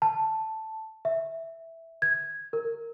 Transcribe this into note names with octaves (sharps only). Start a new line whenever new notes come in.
A5
E5
G#6
A#4